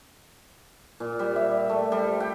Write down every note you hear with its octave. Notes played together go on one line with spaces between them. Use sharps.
A#2
G3
E5
A3
G3
G5